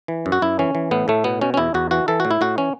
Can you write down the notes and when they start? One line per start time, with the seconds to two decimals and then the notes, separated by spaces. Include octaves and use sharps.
0.08 E3
0.26 F#2
0.32 F#4
0.42 F#2 E4
0.59 E3 C#4
0.75 E3
0.91 A2 B3
1.08 A2 A3
1.24 B2 B3
1.41 B2 C#4
1.54 C#4
1.57 E2 E4
1.74 E2 F#4
1.91 E3 F#4
2.08 E3 A4
2.20 A2 F#4
2.31 E4
2.41 A2 F#4
2.58 E3 C#4